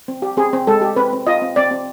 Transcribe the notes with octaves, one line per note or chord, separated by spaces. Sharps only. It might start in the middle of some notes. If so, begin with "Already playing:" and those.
C4
G4
C4 G#4
C4
G#3 A4
G4
C4 B4
C4
F4 D#5
C4
C4 D5
C4